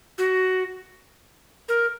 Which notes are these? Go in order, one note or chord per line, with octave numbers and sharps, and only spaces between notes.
F#4
A#4